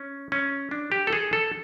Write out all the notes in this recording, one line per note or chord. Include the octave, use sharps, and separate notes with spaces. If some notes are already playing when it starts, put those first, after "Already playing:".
Already playing: C#4
C#4
D4
G4
A4
G#4
A4